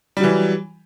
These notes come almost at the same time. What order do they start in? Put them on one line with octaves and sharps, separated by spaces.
G3 F#3 E3